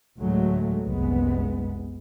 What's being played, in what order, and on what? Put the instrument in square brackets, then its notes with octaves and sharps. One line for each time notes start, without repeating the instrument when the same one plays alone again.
[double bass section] D2 A2 F#3 G#3 A3
F#1 C2 G#3 B3